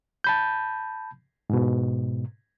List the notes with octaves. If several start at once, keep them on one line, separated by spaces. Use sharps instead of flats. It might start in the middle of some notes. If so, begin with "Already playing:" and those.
A5 B5 G6
G#2 B2